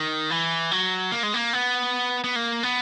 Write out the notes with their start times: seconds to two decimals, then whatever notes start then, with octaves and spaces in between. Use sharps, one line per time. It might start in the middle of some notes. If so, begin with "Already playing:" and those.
Already playing: D#3
0.30 E3
0.71 F#3
1.12 A#3
1.23 G#3
1.34 A#3
1.53 B3
2.24 B3
2.36 A#3
2.63 B3